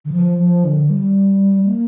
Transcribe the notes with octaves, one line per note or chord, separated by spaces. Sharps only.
D3
F3
F3
D3
G3
A#3